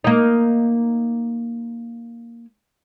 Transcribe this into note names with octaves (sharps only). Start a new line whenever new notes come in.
A#3 D#4